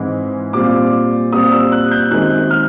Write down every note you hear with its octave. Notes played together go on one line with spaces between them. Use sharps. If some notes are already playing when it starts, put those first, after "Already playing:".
Already playing: G#2 E3 G#3 C4 E4
A#2 G3 C4 F4 D6
A#2 G3 C4 F4 D#6
E6
F#6
G6
F#2 D#3 G#3 C4 F#6
F6